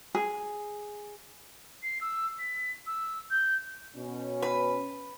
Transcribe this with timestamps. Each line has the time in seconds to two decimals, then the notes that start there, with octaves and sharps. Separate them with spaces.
0.15 G#4
1.83 C7
2.01 E6
2.39 B6
2.87 E6
3.31 G6
3.95 B2 C#4
4.42 B4